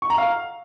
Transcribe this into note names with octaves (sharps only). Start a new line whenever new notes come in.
C#6
A#5
F5